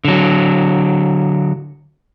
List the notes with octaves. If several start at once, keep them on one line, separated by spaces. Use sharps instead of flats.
D3 F#3